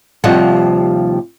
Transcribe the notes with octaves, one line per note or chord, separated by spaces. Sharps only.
D#2 C3 F3 G3 D#5 F#5